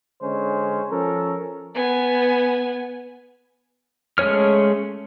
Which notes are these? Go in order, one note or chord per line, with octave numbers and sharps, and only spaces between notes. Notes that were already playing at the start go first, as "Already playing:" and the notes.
D3 G#3 C#4 C5
F3 C#4 A4 A#4
B3 G#5
G#3 A3 C#4 C#5 F6